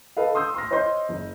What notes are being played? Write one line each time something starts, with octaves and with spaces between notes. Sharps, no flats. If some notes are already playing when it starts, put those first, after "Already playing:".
A4 B4 D#5 F5
C6 D#6 E6 G6
C6 F6 A#6
C5 C#5 D#5 C6 G6
F#1